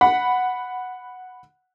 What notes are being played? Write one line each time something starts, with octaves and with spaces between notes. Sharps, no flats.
F#5 B5